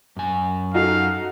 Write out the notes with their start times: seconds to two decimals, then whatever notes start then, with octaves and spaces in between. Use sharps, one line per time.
0.16 F#2 G#5
0.74 D#4 F#4 A4 F5